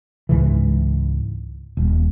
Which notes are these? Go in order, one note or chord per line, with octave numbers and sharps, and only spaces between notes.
C#2 G#2 C#3 E3
D#1